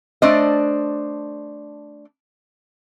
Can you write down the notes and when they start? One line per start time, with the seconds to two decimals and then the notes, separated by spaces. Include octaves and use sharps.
0.22 A3 D4 C5 D5 D#5